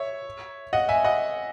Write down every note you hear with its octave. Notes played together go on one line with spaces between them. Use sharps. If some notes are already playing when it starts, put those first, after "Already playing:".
Already playing: C#5 E5
D#5 F#5
E5 G#5
D#5 F#5